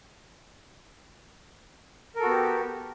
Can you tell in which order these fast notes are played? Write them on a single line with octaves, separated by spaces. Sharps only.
A#4 A4 F#4 B3 G4